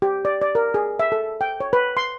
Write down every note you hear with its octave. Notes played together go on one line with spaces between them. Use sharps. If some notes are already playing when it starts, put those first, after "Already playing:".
G4
D5
D5
A#4
G#4
E5
A4
G5
C#5
B4
C6